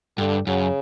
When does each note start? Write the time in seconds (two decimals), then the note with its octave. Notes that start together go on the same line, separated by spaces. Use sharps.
0.18 G2 D3
0.47 F#2 C#3